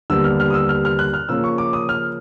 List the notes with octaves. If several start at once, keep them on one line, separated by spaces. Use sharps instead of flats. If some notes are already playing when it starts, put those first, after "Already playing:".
D#2 D3 G3 B3 E6
F6
F6
D#6
E6
F6
F6
F#6
F6
C#3 F3 A#3 C#4 E6
C#6
D6
D#6
F6